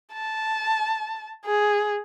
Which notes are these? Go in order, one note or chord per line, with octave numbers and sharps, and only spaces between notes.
A5
G#4